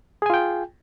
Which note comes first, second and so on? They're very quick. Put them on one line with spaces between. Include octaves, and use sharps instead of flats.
G#4 G#5 F4 G5